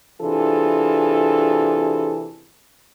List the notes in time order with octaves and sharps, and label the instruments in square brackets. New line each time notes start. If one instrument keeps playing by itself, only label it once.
[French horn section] C3 E3 D4 F4 G#4 A4